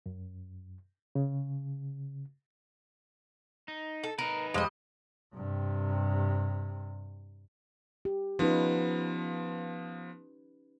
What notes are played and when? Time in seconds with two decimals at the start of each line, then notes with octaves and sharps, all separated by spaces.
0.06 F#2
1.15 C#3
3.68 D#4
4.03 A4
4.19 D#4 A#4 B4
4.54 F2 G3 G#3 D#5
5.35 G2 C3
8.05 G4
8.39 F3 B3 C#4 D#4 B4